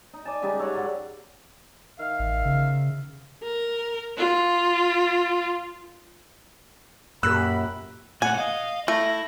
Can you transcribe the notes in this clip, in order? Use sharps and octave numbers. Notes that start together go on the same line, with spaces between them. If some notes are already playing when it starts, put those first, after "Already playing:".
D#4
D5 G#5 A5
C#3 G3 G#3 D#4
A4 C#5 D5 F#5
G#2 F#3
D#3 E5 F5
A1
C#3
A#4
F4
F#2 A#2 G4 A#4 B5 E6 F#6
A#2 A3 F#5 G#5
D#5 F5
A3 E4 A#6